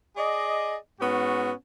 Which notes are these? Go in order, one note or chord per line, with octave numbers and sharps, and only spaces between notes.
G#4 D5 D#5
G#2 B3 C#4 F#4